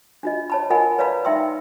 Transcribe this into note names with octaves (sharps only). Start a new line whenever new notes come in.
D4 F4 D#5
C#5 A5 B5
F4 A#4 D#5 F#5 G#5 B5
B4 C#5 D5 F5 A#5 B5
D#4 E5 G5 C6 E6